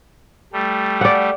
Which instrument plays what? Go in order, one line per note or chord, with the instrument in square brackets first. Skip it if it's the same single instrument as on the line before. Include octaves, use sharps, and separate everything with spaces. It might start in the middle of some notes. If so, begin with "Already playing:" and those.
[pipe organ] G3 A3
[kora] D5 F#5